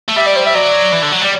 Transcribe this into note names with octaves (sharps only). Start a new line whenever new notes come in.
A3
G3 E5
D5
C5
E5
F#3 D5
E3
D3
F#3
G3 D5